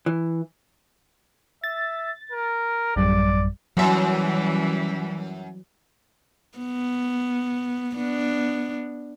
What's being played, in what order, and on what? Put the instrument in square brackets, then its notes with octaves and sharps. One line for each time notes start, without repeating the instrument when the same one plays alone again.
[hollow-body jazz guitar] E3
[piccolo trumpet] E5 [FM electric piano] A6
[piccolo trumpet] A#4
[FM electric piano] A1 F#2 G3 [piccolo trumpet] D5
[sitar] F#2 E5 [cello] E3 G3 [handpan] F#3
[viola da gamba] B3
B3 D4